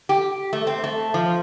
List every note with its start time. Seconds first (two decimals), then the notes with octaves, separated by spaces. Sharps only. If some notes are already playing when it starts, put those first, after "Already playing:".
0.09 G4
0.53 A3
0.67 C4
0.84 A3
1.14 F3